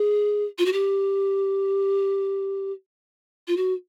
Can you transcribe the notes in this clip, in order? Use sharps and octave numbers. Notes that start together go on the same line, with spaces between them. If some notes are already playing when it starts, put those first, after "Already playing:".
Already playing: G#4
F4
F#4
G4
F4
F#4